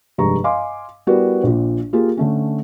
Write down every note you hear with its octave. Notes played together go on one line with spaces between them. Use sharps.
F1 G2 G#3 A#5 C#6
D#5 F5 G#5 C6 D6
G3 B3 E4 F#4 A#4 D5
A#1 A#2
A#3 F4 G4 G#4
D3 A3 C#4